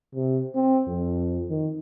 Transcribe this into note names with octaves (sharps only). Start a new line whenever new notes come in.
C3
C4
F2
D#3